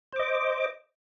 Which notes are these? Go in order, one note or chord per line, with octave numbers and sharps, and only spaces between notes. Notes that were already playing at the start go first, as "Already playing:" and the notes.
C5 D#5 D6